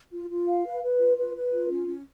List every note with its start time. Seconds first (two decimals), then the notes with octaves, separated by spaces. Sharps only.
0.11 F4
0.29 F4
0.47 F5
0.65 B4
0.82 B4
0.99 F4
1.17 B4
1.34 B4
1.52 F4
1.70 C#4
1.87 C#4